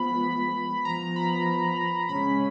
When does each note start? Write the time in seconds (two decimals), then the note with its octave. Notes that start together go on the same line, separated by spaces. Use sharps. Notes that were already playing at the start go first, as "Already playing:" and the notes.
Already playing: F3 G#3 B3 B5
0.85 F3 B3 A#5
1.16 B5
2.09 C#3 G#3 C#4 B5